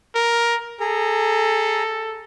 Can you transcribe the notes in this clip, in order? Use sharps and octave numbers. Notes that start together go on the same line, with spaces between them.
A#4
G#4 A4 A#5